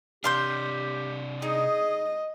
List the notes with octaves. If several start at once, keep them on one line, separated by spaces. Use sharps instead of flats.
C3 D4 G4 F5 C6 G6
D#4 G#4 D#5